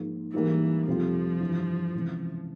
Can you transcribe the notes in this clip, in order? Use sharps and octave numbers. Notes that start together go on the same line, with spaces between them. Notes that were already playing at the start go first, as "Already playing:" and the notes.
Already playing: G#2 F3 A#3
G#2 E3 G3 A#3
F2 C3 F3 G3 C4 F4
G2 E3 G3
C#2 C3 E3